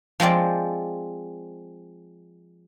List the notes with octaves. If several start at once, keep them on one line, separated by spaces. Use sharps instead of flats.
F3 G#3 C4 D5